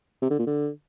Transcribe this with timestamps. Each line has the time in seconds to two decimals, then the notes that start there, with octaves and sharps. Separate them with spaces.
0.22 C3
0.30 D3
0.39 A#2
0.47 D3